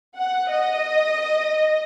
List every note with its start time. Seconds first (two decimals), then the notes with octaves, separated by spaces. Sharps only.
0.17 F#5
0.49 D#5